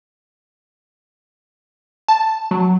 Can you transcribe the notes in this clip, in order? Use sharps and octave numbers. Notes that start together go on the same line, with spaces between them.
A5
F#3